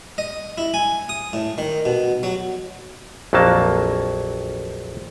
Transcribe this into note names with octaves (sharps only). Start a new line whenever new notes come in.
D#5
E4
G#5
D#6
A2
D#3
B2
F#3
A#1 F2 F#3 A#3 A5